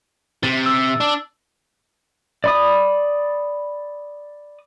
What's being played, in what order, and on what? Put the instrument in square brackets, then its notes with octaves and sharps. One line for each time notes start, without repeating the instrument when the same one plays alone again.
[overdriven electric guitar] C3 [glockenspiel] A6
[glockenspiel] E6
[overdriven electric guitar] D4
[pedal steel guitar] D5 B5 D#6